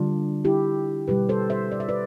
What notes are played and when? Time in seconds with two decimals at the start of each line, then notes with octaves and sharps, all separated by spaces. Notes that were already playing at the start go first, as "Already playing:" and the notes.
Already playing: D3 G3 D4 F4
0.45 E4 G4
1.08 B2 G3 G4 B4
1.29 A4 C5
1.50 C5 E5
1.72 D5
1.80 E5
1.89 B4 D5